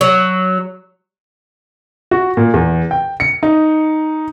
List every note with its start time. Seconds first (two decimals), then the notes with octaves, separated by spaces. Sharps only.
0.01 F#3
2.11 F#4
2.37 A#2
2.54 E2
2.91 G5
3.20 C#7
3.43 D#4